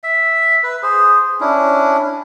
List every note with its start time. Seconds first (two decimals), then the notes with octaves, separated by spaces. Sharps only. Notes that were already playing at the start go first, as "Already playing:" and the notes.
0.04 E5
0.63 B4
0.83 G#4 C5
1.41 C#4 D4 E4